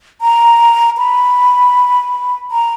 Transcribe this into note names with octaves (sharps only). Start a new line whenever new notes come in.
A#5
B5
A#5